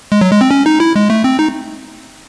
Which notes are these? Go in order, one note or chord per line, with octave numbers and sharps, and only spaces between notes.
G#3
F#3
G#3
C4
C#4
D#4
E4
G#3
A3
C4
D#4